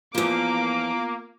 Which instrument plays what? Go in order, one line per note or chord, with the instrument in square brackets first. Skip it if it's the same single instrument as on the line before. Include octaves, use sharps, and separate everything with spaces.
[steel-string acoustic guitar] E2 F3 [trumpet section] A#3 [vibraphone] B3 F4 [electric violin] D6